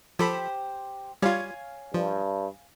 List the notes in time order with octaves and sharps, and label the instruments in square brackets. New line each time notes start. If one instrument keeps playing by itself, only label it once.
[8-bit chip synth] F3 A4 B5 [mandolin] G4 C5
[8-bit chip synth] G3 F4 [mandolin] C#5 F5 G#5
[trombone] G2 [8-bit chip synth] F3